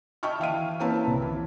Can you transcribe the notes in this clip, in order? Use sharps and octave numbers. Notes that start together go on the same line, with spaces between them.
D#5 E5 G5 A5 C#6 F6
E3 F5 F6 D#7
A#3 C4 E4 B4 C#5 A5
C2
E3